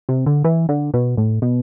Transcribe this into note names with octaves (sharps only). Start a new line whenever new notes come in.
C3
D3
E3
D3
B2
A2
B2